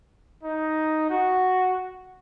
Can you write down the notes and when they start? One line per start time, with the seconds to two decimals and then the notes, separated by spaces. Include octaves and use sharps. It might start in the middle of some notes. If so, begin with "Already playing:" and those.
0.43 D#4
1.09 F#4